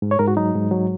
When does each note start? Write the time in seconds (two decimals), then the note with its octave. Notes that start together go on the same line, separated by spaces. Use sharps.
0.02 G#2
0.11 C#5
0.19 G#2 A#4
0.28 F#4
0.37 F#3 D#4
0.55 G#2
0.71 F#3